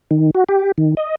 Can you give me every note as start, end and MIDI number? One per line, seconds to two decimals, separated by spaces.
0.11 0.31 51
0.35 0.44 66
0.49 0.72 67
0.78 0.95 51
0.97 1.15 75